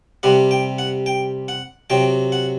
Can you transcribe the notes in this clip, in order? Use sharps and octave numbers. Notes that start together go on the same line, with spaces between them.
C3 G3 F#5
G5
F#5
G5
F#5
C3 F#3 G5
F#5